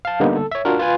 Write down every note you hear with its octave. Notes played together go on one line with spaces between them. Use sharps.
F5 A5
D3 G3 A#3 B3 D#4
A4
C#5 E5
D4 F4 F#4 A#4
F4 B4 G#5